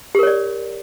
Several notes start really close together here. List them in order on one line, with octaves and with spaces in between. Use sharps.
G4 A#4 C#5 D5